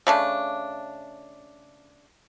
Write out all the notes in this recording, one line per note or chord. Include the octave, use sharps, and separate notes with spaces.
C#3 A3 D4